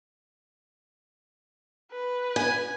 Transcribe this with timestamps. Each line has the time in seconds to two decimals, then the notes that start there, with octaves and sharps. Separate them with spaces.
1.92 B4
2.36 G#5